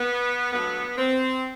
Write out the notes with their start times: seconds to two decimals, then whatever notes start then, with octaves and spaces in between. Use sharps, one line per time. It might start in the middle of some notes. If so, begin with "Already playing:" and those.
Already playing: B3
0.52 G2 F#3 A3 B3
0.97 C4